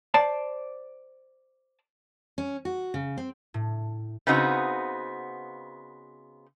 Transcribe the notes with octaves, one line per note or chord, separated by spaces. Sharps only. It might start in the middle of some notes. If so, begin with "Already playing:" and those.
C5 D5 A5
C#4
F#4
C#3
C4
A2
C#3 B3 C4 D#4 F#4